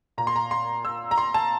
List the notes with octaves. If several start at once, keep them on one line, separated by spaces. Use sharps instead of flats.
A#2 A#5
C6
A#5
C6
E6
A#5
C6
A5